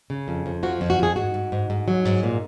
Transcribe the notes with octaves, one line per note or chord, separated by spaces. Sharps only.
C#3
F2
F2
F3 F#4
F2
F#4
F2 G#4
G#2 F#4
G#2
G#2
G#2
F#3
G#2
A#2